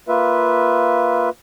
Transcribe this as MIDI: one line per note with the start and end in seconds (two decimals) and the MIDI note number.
0.08 1.29 58
0.08 1.29 65
0.08 1.29 71
0.08 1.29 76